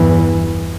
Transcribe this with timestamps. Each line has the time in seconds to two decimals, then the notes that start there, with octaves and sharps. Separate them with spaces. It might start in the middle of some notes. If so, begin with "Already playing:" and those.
Already playing: E2 G2 E3